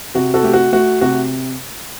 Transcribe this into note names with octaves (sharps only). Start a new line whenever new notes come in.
C3 F#4
F#4 A4
A3 G4
F#4
A3 F#4
C3 F#4